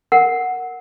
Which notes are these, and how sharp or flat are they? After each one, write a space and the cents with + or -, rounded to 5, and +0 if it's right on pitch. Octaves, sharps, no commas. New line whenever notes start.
A#4 +0 F#5 +0